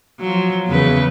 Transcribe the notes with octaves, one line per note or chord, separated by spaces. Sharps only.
F3 F#3
E2 C#3 B4